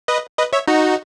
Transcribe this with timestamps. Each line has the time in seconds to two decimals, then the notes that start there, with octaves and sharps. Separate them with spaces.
0.08 B4 D#5
0.38 B4 D#5
0.53 C#5 E5
0.68 D#4 F#4